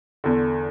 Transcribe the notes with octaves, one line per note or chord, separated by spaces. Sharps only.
E2 D3